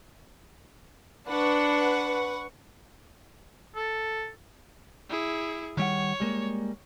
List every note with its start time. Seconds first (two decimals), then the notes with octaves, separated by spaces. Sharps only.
1.28 D4 B4 F#5 C#6
3.76 A4
5.10 E4 G#4
5.77 D#3 G3 C#5 F#5
6.20 G3 G#3 A#3